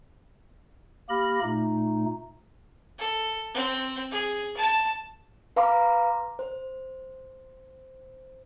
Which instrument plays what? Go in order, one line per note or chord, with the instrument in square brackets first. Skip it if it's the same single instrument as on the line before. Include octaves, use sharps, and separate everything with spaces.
[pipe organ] A#3 G4 B5 F6 A#6
A#2 A3 D#4
[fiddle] A4
C4
G#4
A5
[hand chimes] B4 F5 A#5 C6 D6
C5